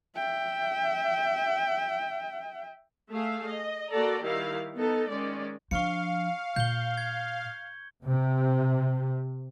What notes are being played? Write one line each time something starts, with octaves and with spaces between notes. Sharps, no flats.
E5 G5
A3 G#4 E5 F5
D#5
A#3 F#4 A4 D5 A#5
D#3 G3 E4 G4 F5
B3 D#4 A4
D#3 G#3 C#4 D5
F3 D4 F5 C#6 C#7
A#2 G6 G7
G#6
C3